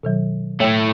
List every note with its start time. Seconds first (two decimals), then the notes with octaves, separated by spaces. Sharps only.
0.03 B2 D#3 F#3
0.60 A2 A3 C#5 G5